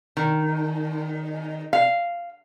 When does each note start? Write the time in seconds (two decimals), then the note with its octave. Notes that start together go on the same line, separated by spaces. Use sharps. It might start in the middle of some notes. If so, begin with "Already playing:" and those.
0.17 D#3
1.73 F5